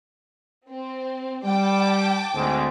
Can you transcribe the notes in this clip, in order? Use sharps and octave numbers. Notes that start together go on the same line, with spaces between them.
C4
G3 G5 A5 D6
D2 G#2 C4